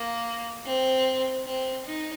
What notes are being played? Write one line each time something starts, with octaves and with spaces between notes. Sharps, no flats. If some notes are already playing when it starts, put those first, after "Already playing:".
Already playing: A#3
C4
C4
D#4